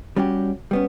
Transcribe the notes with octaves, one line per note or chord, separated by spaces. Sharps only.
G3 C#4 F#4 G4
G3 B3 C#4